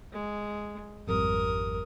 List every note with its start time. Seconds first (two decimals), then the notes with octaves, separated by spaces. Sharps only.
0.12 G#3
1.08 G#1 F2 G3 A#4 D#6